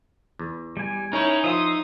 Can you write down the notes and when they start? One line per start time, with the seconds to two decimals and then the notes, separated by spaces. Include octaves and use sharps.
0.39 E2
0.77 G3 G#5
1.13 C#4 D#4 E4 A#4 C#5 G#5
1.44 F3 D#5 E5 C6 D#6